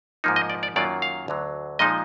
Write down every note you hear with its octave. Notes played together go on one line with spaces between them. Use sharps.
G#2 F3 A#3 D#4
D#5
D5
D5
F#2 D#3 F#3 A#3 F4 D5
F5
D2 D3 F#3
A#2 F3 G#3 D#4 D#5